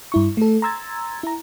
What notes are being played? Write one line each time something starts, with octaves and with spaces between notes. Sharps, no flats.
G2 E4 C#6
A3 A4
A#5 C6 E6 G#6 A6
E4 A#5